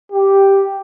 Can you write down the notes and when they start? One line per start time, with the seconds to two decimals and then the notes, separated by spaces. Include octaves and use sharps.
0.12 G4